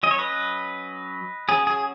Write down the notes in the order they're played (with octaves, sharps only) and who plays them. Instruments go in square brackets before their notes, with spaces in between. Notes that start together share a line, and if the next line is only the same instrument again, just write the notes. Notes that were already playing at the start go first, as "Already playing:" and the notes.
[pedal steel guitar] F#3 C#4 D#5
C#5
B4 D#5
F#3 C#4 G#4
G#4